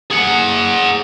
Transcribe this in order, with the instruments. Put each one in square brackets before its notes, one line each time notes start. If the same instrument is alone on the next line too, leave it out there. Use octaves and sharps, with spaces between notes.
[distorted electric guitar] G#4 F#5